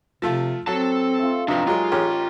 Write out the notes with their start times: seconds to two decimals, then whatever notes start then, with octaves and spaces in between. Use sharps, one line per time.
0.22 C3 F3 A3 F4
0.67 F#3 C4 A4 A5
1.19 A3 F4
1.48 C3 F3 D4 D#4 G4 B4 D5
1.67 F#3 G#3 F4 G4 G#4 A#4
1.92 A1 C#4 G4 A#4 C#5